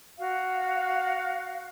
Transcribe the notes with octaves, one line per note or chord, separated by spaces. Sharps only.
F#4 F5